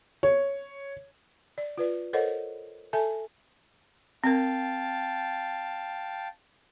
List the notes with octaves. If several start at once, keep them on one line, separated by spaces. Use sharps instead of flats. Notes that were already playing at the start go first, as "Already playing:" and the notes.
C#5
D5
F4 B4 D5
A4 A#4 C5 C#5 D#5 F#5
A4 E5 G#5 A5
C4 A#4 F5 G5 A5